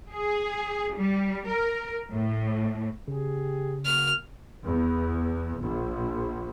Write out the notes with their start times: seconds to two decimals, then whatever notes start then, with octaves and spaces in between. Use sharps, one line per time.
0.13 G#4
0.97 G3
1.48 A#4
2.11 A2
3.08 C#3 G4 G#4
3.85 A#3 F#4 F6
4.64 E2
5.61 A#1